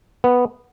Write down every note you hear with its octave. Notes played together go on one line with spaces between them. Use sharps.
B3